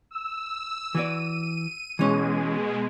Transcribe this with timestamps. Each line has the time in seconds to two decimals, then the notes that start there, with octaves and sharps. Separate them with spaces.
0.11 E6
0.95 E3 F#4 D5 D#7
1.99 B2 E3 G#3 C#4